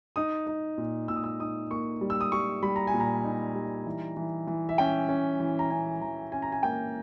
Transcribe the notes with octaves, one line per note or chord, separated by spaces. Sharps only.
D#4 D#6
D#4
A#2
A#2 E6
D#6
E6
D#4 D#6
A#3 C#6
G3
E6
D#6
G3 C#6
G3 B5
A#5
G#5
A#2
A#5
D#4
G3
E3
E3
E3
E5
C#4 G5
C#4
E3
A#5
C#4 G#5
E3 A#5
C#4 G#5
A#5
G#5
A#3 G5